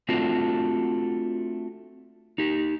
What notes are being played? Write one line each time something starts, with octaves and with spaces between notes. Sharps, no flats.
A3 C4 D4 F4 F#4
D#4 G4